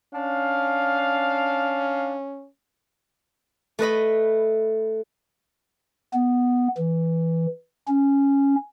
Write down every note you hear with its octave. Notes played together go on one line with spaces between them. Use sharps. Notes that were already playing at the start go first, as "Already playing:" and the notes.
C#4 D4 F5
A3 B4 D#5 B5
B3
E3
C#4